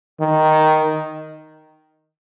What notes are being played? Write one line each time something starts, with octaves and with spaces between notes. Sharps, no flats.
D#3